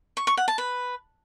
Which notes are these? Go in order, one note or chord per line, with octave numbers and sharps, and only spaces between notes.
C#6
C#6
F#5
A5
B4